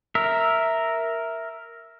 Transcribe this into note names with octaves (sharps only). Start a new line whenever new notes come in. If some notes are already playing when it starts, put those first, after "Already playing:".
A#4 E5